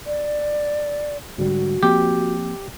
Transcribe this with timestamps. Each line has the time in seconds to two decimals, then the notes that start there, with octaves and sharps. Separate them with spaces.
0.06 D5
1.38 G#2 D3 G3 F#4
1.83 F3 A#3 C4 G4